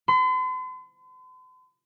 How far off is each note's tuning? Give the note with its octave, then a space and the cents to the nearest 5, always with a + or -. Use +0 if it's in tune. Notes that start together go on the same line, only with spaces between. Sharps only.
C6 -45